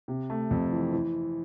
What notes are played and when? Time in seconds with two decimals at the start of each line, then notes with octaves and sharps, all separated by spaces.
0.08 C3
0.30 A3
0.51 F2
0.72 E3
0.93 E3